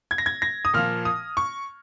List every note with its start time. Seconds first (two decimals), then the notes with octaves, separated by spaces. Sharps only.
0.11 G#6
0.18 A#6
0.26 G#6
0.42 A#6
0.65 D#6
0.74 A#2 F3 F6
1.05 D#6
1.37 C#6